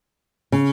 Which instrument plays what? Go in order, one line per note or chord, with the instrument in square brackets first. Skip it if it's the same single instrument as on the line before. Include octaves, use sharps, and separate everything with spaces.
[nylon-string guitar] C#3